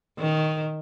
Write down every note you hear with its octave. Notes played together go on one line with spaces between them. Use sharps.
D#3